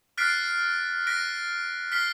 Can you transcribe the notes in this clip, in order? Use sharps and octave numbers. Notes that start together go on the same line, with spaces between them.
F6 F#6 A6 B6 C7 D7
F#6 A#6 B6 D7
F6 B6 C7 G7